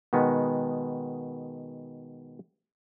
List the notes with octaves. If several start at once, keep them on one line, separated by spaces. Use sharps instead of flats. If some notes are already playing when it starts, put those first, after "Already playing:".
B2 D#3 G#3 B3